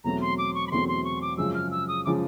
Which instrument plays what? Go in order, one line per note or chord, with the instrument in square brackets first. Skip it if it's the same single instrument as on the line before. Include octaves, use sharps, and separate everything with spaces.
[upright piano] E2 B2 F#3 A3 C4 [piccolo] A#5
[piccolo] C6
D6
C#6
B5
[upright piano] E2 B2 F#3 A3 C4 [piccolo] C6
[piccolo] C6
C#6
D6
[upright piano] F#2 C#3 F3 G#3 [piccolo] E6
[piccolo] F6
E6
D#6
[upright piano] C#3 F3 G#3 [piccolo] D6